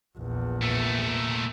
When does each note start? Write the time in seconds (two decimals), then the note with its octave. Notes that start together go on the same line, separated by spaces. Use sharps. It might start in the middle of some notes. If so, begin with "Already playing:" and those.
0.16 A#1 E2
0.62 A#2 A3